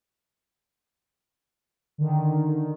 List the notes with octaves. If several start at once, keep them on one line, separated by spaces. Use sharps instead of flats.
D3 D#3